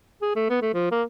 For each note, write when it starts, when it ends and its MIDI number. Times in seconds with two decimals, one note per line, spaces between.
0.22 0.33 68
0.36 0.45 57
0.50 0.59 59
0.62 0.70 57
0.74 0.90 53
0.91 1.03 58